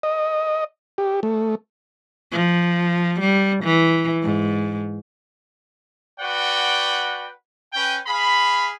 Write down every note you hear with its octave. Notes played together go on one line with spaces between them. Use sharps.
D#5
G4
A3
F3
G3
E3
G#2
F#4 B4 D5 F#5 G5
C#4 B4 G5
G#4 F5 B5